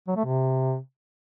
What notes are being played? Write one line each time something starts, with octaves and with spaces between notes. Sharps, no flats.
F#3
A3
C3